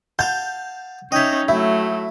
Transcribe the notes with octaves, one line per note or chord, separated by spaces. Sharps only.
F5 F#5 A5 G6
C#4 D#4 D#5 E5 G5 G6 G#6
F#3 A3 E4 E5